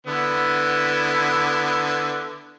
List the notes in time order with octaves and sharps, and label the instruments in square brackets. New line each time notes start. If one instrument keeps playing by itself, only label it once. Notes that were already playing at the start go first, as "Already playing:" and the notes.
[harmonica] D3 B3 E4